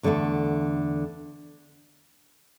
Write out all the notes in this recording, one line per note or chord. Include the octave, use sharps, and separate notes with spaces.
E2 D3 A3 D4